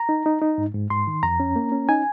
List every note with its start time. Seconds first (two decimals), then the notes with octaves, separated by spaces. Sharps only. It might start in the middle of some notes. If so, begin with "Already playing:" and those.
Already playing: A#5
0.09 D#4
0.26 D#4
0.42 D#4
0.58 G#2
0.75 G#2
0.90 G#2 C6
1.07 D#3
1.23 F2 A#5
1.40 C#4
1.56 A#3
1.72 C#4
1.89 D#4 G#5